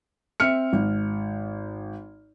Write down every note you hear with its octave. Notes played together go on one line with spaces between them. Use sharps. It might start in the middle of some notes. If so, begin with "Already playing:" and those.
C4 E5 F6 C#7
G#1